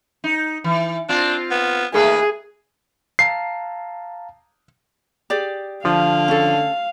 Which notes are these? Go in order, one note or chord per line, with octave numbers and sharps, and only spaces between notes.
D#4
E3
C4 D4 F4
B3
D#3 A3 A#3 G#4 B4
F5 A5 A#5 C7
G4 G#4 D5
D3 F3 F5
C#4 A4